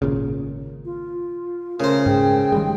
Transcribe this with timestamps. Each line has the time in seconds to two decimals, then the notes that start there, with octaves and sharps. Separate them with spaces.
0.02 G#1 A#2 C#3
0.85 F4
1.80 C#3 A3 A#4 C5
2.06 G#2 G#4 G5
2.52 D#3 G3 G#3